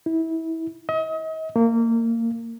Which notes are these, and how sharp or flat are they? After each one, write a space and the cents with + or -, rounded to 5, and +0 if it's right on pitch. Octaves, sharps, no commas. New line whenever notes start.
E4 -25
D#5 +40
A#3 -25